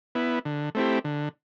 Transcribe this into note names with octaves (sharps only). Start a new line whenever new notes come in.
B3 E4
D3
A3 C4 E4 G4
D3